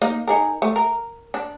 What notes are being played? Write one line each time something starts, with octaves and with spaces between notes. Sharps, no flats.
A#3 D#4
D#4 G#4 A#4
A3
A#4
D4